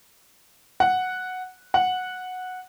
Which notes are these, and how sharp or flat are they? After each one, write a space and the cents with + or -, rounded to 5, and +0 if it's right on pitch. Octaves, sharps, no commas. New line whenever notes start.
F#5 -5
F#5 -10